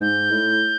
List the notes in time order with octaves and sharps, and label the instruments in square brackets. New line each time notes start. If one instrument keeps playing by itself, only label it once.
[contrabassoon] G#2 [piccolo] G6
[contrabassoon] A2